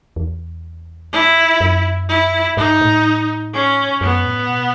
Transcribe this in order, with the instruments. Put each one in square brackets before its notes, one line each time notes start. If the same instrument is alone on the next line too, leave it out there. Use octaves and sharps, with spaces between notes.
[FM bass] E2
[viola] E4
[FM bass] F#2
[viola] E4
[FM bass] G#2 [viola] D#4
[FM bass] A2
[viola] C#4
[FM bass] F#2 [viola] B3
[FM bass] A2
B2